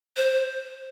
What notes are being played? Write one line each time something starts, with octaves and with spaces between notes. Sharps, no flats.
C5